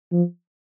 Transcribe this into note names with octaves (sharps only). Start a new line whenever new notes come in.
F3